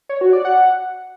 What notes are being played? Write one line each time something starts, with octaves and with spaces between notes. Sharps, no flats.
C#5
F#4
D5
F#5